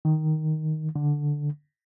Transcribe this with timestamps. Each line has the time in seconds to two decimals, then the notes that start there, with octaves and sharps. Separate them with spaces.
0.05 D#3
0.96 D3